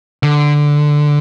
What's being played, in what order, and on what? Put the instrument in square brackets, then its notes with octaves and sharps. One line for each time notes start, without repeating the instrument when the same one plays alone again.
[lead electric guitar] D3